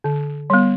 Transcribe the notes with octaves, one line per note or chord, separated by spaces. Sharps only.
D3
G3 B3